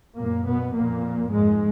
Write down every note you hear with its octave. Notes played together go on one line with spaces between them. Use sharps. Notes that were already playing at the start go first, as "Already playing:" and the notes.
F#2 A#2 A#3
B2 B3
F2 A#2 A#3
F2 G#2 G#3